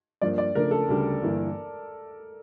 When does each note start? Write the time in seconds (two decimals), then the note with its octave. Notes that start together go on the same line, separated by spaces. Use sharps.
0.22 G2 F3 A#3 D5
0.38 D5
0.55 C#3 F3 A3 D4 A#4
0.71 A4
0.88 D2 C#3 G3 D4
1.22 G1 G2 E3 A#3